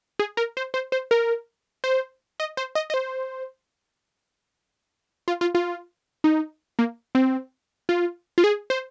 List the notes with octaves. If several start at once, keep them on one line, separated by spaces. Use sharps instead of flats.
G#4
A#4
C5
C5
C5
A#4
C5
D#5
C5
D#5
D#5
C5
F4
F4
F4
D#4
A#3
C4
F4
F4
G#4
C5